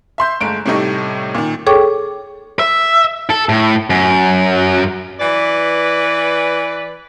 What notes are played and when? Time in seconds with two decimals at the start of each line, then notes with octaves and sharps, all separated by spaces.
0.18 E5 C6 G6
0.41 G1 G#3 A3 D7
0.66 A2 C3 G3 A3 D#4 C#6
1.35 A#2 D#3
1.67 G#4 A4 C#5 G5 C#6 D6
2.59 E5
3.30 A4
3.49 A2
3.90 F#2
5.20 E3 B4 D5